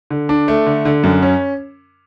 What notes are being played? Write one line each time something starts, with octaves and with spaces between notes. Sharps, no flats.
D3
D4
A3
D3
D3
F#2
C#4